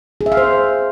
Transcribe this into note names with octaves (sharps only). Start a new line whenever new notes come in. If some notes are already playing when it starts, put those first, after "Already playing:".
G#4
E5
F5
C5